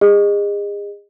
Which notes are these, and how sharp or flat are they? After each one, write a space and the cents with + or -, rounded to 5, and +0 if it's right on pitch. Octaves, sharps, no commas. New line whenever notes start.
G#4 -35 D#5 -20